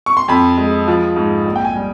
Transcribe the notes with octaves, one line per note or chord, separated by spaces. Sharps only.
C#6
C6
F2 B5
G#3
F3
G#2
A#1
G5
G#5
G3